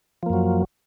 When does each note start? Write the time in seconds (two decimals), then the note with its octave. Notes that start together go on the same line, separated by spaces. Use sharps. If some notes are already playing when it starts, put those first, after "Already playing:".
0.23 F3
0.26 A#3
0.30 F#2
0.33 F#3